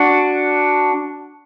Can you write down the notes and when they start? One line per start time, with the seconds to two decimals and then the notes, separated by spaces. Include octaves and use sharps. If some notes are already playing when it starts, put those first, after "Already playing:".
Already playing: D4 F#4